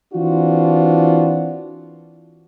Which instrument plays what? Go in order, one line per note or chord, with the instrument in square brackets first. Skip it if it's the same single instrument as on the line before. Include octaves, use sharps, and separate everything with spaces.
[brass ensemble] E3 C4 D4 F4 F#4